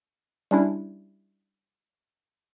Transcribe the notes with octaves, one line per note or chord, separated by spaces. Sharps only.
G3 C#4 D4 E4